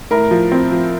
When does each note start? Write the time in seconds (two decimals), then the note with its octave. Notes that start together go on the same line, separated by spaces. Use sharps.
0.11 A2 A#4
0.31 F3
0.52 C4
0.72 F3